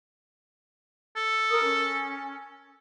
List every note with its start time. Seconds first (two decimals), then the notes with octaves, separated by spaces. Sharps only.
1.17 A4
1.50 A#4 D#6
1.64 C#4